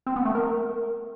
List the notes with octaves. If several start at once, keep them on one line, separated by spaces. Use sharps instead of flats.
C4
B3
A3
A#4